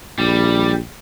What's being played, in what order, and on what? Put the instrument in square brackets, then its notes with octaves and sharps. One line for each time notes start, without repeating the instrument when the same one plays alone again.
[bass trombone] A#1 [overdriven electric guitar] G3